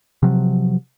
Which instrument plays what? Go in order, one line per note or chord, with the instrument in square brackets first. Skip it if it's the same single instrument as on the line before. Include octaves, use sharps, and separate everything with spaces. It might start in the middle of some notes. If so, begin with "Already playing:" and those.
[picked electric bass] C3 F3 F#3